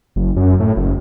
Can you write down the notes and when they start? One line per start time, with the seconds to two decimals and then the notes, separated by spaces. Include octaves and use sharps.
0.16 F#1
0.36 F#2
0.60 A2
0.77 F#1